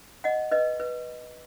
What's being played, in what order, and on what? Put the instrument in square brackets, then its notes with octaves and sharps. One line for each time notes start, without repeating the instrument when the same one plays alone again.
[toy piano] D#5 F#5
B4 D#5
B4